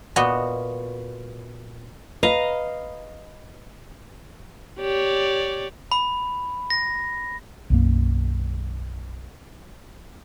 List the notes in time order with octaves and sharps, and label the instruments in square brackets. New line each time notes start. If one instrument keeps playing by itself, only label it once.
[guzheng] A#2 B3 F#4 D#5
[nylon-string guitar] B4 [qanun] D#5 F5 A#5
[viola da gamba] G4 C#5 D5
[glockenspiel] B5
A#6
[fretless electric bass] B1 F#2 A#3